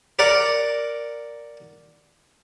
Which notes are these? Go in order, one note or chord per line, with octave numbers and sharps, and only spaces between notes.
A#4 D5 F#5